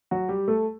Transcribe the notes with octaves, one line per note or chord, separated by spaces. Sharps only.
F#3 F#4
G3 G4
A3 A4